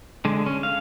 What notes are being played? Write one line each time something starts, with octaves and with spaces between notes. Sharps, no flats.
D3 G#3
C#4
F5